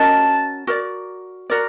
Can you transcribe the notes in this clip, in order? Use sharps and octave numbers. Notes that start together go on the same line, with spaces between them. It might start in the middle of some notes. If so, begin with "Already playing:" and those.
Already playing: C#4 F#4 A#4 D#5 A5
F#4 A#4 D5
F#4 A#4 D5